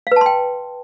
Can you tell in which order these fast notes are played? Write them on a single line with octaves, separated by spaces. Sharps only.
F5 B4 A5 C6 G5